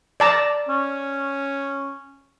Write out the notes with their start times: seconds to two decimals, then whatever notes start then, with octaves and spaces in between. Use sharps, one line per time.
0.20 D5 A5 A#5
0.69 C#4